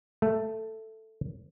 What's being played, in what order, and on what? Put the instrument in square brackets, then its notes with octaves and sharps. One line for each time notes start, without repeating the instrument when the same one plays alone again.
[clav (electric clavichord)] A3